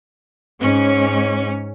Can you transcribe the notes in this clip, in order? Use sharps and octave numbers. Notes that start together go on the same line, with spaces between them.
G#2 C#4